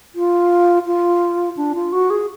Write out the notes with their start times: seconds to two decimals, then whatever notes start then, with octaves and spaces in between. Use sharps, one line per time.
0.15 F4
0.86 F4
1.57 D4
1.75 F4
1.92 F#4
2.10 G#4